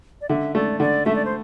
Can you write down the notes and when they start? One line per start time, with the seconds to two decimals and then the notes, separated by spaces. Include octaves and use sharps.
0.21 D5
0.29 D3 E5
0.55 A3 D5
0.80 D3 D5
1.06 A3 E5
1.16 D5
1.25 C5